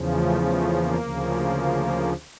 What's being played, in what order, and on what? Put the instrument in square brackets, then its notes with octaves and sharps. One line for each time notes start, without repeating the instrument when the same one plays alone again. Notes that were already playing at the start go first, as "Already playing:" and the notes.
Already playing: [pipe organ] E2 C#3 F3
A3
A3
A#3
D2 C#3 F3